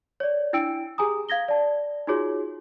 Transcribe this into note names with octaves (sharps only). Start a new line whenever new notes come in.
C#5 D5
D4 E4 G5 E6 D7
G4 G#4 G#5 A#5 D#6
F5 G#6 A#6 G7
D5 A5
D#4 F4 F#4 G#4 C#5